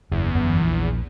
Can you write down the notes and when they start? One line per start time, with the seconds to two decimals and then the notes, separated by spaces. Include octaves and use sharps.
0.12 F#1 E2
0.35 G1 F#2 B3
0.63 A#1